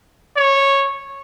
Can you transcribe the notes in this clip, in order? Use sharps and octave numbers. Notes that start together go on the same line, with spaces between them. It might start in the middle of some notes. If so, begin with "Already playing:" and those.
C#5